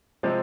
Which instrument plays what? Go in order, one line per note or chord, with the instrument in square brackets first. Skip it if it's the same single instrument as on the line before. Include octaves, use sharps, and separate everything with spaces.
[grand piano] C3 F3 G#3 C4